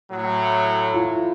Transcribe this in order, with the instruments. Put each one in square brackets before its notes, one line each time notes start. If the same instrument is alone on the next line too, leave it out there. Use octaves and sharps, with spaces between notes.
[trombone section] A2 F#3
[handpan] E4 F4